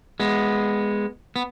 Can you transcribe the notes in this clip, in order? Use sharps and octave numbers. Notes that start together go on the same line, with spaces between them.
G#3 B3
B3